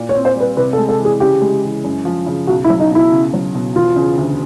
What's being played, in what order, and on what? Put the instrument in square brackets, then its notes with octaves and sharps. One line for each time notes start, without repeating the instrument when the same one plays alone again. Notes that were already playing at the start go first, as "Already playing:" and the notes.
Already playing: [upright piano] A#2
[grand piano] C#5
[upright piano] C4
[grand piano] C5
[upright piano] G3 [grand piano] B4
[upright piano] C3 [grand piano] B4
[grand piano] A4
[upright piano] G#3
[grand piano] A4
[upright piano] E3
[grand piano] G#4
[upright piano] C#3 [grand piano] G4
[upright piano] G#3
E3
F#2
F3
C#3
[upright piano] B1 [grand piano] F#4
[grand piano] E4
[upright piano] F#3
[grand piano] D#4
[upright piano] B2 [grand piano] E4
[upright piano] C#2
F#3
B2
[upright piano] E1 [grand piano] F4
[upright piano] C#3
D2